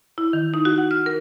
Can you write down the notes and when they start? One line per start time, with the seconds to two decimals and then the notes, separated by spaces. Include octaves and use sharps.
0.18 E4
0.33 D#3
0.54 D#4
0.65 F#4
0.78 F#5
0.91 F6
1.06 A#4